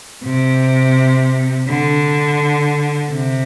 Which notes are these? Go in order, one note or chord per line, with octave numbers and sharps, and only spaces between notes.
C3
D3
C3